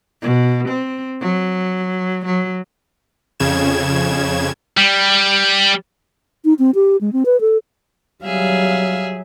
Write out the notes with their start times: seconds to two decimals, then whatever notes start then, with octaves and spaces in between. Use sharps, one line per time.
0.22 B2
0.68 C4
1.21 F#3
2.25 F#3
3.39 F2 C#3 G#6 E7
4.78 G3
6.45 D#4
6.59 C4
6.75 G4
7.01 G#3
7.13 C4
7.26 B4
7.41 A4
8.24 F#3 G3 G#4 E5 F5